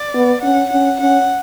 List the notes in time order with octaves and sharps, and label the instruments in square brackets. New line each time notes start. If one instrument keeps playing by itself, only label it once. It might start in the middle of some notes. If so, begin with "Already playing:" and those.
Already playing: [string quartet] D5
[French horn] B3
[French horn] C#4 [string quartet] F#5
[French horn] C#4 [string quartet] F#5
[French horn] C#4 [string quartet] F#5